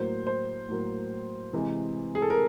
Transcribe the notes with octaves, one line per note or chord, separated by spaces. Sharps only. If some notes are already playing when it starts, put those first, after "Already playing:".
Already playing: A2 F#3 A#3 C5
C5
A2 F#3 A#3
C3 E3 G#3
G#4
A4
A#4